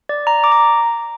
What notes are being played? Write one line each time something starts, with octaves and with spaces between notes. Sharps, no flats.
D5
A#5
D6
A#5